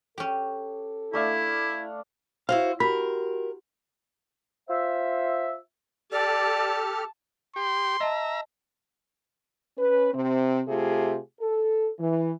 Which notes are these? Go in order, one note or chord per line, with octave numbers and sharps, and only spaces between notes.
C#4 G4 A4
A3 D4 E4 F5
E4 F#4 C5 F5
F#4 G4 A#4 B5
F4 C5 E5
G4 A4 D5 A5 F6
G4 C6
D#5 E5 A5 A#5
C#4 B4
C3 C4
C3 A3 F4 G4 G#4
A4
E3